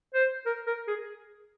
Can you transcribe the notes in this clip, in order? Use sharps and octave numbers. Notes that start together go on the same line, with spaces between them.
C5
A#4
A#4
G#4